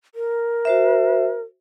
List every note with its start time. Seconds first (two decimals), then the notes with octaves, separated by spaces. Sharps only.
0.15 A#4
0.65 F#4 C5 E5